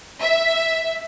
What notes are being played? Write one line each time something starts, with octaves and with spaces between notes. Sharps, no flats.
E5